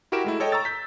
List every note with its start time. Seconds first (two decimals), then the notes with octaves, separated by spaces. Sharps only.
0.12 E4 F#4 G4 A#4 D7 E7
0.24 G#3 A3 E4
0.40 A4 C#5 D#5 G5
0.52 A#5 C#6 E6 A6
0.65 G6 B6